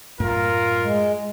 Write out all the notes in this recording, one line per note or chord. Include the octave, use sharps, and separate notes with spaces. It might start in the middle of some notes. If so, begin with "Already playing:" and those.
F#2 A2 A3 F4 A#4
G#3